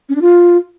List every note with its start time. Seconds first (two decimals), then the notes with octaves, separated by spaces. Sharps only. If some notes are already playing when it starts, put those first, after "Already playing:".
0.09 C#4
0.15 D4
0.21 F4